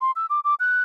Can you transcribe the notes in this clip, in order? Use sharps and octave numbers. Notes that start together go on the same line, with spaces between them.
C6
E6
D6
D6
F#6